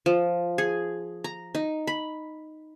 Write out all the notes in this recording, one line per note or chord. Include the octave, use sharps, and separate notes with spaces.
F3
G#4
A#5
D#4
B5